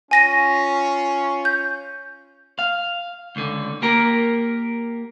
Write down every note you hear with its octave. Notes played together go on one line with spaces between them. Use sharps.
C#4 F4 G#5 A#6 D#7
G6
F5
C#2 D3
A#3 G4 A#4